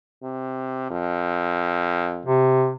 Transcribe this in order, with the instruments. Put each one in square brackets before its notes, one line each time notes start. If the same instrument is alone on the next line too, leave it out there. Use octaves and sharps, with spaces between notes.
[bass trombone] C3
F2
[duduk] C3